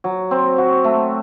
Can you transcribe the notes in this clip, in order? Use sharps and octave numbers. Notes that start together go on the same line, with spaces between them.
F#3
C4
F#4
A3